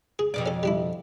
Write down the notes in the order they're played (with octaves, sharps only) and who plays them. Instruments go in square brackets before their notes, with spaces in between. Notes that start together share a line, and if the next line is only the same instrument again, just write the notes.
[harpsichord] G#4
[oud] F2 B2 D5
[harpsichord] C#4 A4
G3 D4 E4